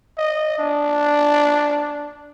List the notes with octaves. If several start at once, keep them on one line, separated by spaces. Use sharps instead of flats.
D#5
D4